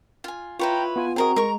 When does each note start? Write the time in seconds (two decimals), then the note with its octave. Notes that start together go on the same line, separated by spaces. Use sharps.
0.24 F4 G#5
0.59 E4 F4 B4 C#5 G5 A#5
0.96 B3 F4 G#5
1.16 C4 F#4 G#4 A#4 D#5 A#5
1.36 G#3 A#4 C#6